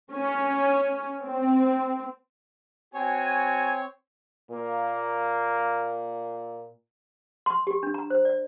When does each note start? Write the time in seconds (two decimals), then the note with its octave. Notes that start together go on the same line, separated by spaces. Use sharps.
0.13 C#4
1.21 C4
2.94 C4 F#4 C#5 G#5
4.51 A#2 A#3
7.46 C6
7.67 G4
7.83 D4
7.94 A#5
8.10 C5
8.25 D5